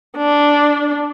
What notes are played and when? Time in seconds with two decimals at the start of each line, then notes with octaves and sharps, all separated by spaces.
0.17 D4